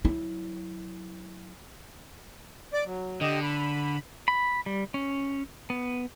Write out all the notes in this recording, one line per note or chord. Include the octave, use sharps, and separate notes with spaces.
F#3 E4
D5 D6
F#3
D3 G4 D#5
B5
B5
G3
C#4
B3